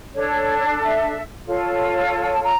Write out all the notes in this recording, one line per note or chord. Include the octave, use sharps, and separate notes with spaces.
D4 A4 C#5
D5
C#5
D5
E5
F4 A4 C#5
A5
A5
A#5